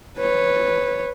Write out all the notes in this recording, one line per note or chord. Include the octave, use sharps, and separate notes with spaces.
B4 C#5